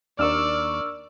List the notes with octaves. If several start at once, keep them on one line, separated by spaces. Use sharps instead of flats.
D#2 D4 A#4 D5 C#6 E6 F6